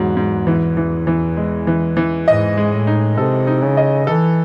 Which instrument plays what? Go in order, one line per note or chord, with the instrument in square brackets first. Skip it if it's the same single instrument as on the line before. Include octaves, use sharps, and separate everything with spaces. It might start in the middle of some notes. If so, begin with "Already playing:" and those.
Already playing: [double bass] E2 [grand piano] G#2 F#3
[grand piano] G#2
E3
E3
E3
G#3
E3
E3
[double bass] G#2 [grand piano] D#5
[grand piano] G#3
[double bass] A2
[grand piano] D#4
[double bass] C3 [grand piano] A4
[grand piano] D#4
[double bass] C#3
[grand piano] D#5
[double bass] E3 [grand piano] A4